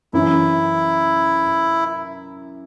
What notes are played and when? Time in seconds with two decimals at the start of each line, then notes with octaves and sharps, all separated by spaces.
0.13 F#2 E3 C#4 E4